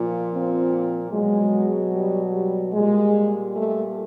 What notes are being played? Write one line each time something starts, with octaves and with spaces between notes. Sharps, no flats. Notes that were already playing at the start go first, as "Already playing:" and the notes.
Already playing: A#2 F3
C4
B2 F#3 G#3
G3
G3
A#2 G3 G#3
A3